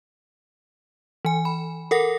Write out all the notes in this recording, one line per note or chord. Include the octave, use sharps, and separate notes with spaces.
E3 G#5
B5
A4 A#4 F#5 A#6